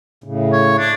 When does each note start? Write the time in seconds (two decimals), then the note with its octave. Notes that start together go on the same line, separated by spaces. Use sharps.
0.24 A2 C#3
0.53 C#5
0.78 D4